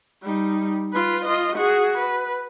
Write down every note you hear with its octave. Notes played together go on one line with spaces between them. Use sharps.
G3 D#4
F4 B4
F4 D#5
F#4 G#4
B4